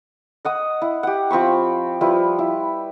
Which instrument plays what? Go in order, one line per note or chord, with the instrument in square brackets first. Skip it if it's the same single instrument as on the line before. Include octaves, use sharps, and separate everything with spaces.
[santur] D#5 F#5 D#6
E4
G4 F#5
F3 C4 B5 C#6
F3 G3 E4 B4
E4